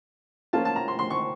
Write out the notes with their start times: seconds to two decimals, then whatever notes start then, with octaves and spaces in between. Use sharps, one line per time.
0.53 F3 A#3 C#4 F4 A5
0.65 A5
0.76 A#5
0.88 C6
0.99 C6
1.10 C#6